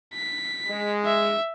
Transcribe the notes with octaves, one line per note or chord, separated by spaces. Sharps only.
B6
G#3
E5